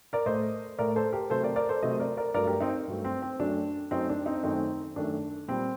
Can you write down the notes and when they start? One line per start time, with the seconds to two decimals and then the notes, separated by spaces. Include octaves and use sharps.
0.13 A#4 D5
0.26 A2 A3 C5 D#5
0.79 A2 A3 A#4 D5
0.96 A4 C5
1.13 G4 A#4
1.30 C3 F#3 A3 A4 C5
1.43 A#4 D5
1.56 A#4 D5
1.69 A4 C5
1.82 C3 F#3 A3 C5 D#5
2.00 A#4 D5
2.17 A#4 D5
2.34 G2 F#3 A3 A#4 D5
2.47 G4 A#4
2.60 C4 D#4
2.88 G2 F#3 A3
3.04 C4
3.22 C4
3.40 F#2 F#3 A3 D4
3.91 F#2 F#3 A3 C4 D#4
4.09 D4
4.26 C4 D#4
4.43 F#2 D#3 A3 C4 D#4
4.96 F#2 D#3 A3 D4
5.48 A#2 G3 C4